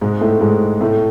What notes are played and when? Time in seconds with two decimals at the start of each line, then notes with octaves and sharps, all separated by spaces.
0.01 G#2 G#3
0.21 A2 A3
0.41 G#2 G#3
0.81 A2 A3